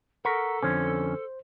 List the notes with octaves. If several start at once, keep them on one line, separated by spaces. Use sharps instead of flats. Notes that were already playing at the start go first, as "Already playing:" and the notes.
A4 A#4 F#5 C#6 B6
F2 D3 C#4 C5